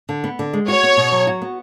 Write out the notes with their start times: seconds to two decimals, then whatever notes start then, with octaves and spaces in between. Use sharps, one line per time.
0.09 D3
0.24 B3
0.39 D3
0.53 G#3
0.68 F#4 C#5
0.83 B3
0.97 B2
1.12 F#3
1.27 F#4
1.42 B3